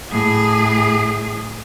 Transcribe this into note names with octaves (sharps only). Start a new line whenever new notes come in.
A2 G#4